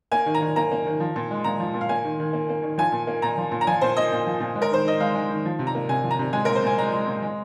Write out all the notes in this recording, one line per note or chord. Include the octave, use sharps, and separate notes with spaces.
A#3 G#5
D#3
A#5
D#3
A#3 A#5
A#3
D#3
F3
A#2
G#3
A#2 A#5
F3
A#2
F5
A#3 G#5
D#3
D#3
A#3
A#3
D#3
F3 G#5
A#2
A#3
A#2 A#5
F3
A#2
A#5
F3 G#5
A#2 C5
A#3 D#5
A#2
F3
A#2
G#3
A#4
D#3 C5
D#3 D#5
G#3 F5
G#3
D#3
F3
C3
A#5
A#3
C3 G#5
F3
A#5
C3
G#3 G#5
A#2 A#4
C5
A#2 G#5
G#3 A#5
G#3
A#2
G#3